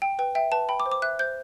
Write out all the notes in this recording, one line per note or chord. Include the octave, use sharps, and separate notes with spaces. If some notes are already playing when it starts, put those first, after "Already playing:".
G5
B4 G5
E5 G5
B4 A5
G5 B5
D6
C5
D6
E5 F#6
C5 G6